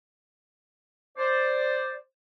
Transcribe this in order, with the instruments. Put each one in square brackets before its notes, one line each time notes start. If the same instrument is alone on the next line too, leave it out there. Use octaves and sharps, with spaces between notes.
[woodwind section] C5 D5